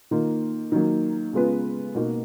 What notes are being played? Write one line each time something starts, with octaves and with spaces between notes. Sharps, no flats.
D#3 A#3 F4
D#3 F#3 A#3
C#3 G#3 B3 F4 B4
B2 A#3 D#4 F#4